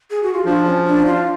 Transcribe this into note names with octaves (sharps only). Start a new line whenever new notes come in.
G#4
F#4
F4
F3 D4
C#4
D4
F4